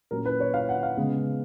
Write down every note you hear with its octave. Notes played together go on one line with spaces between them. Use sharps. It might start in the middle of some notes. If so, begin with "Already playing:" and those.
A#2 F#3 C#4 A#4
B4
C#5
F5
F#5
F5
C#3 G#3 B3